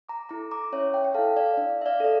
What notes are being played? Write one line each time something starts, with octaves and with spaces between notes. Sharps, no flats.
A#5 D6
E4 A4 A#5 D6
A#5 D6
C#4 C#5 E5
E5 G5
G5
E4 A4 F5 A5
D5 F5
D4 D5
E5
D5 F5
A4 D5